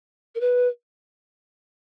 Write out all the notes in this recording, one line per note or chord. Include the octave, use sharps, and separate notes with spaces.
A#4
B4